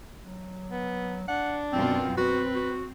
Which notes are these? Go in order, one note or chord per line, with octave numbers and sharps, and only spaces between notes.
F#3
B3
D4 F#5
F#2 B2 C4 F4
C4 F#4 B4
F#4